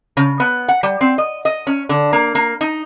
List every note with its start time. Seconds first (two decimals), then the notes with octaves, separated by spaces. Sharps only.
0.17 C#3
0.40 B3
0.68 F#5
0.83 G3
1.01 C4
1.18 D#5
1.45 D#5
1.67 C#4
1.89 D3
2.13 A#3
2.35 A#3
2.61 D#4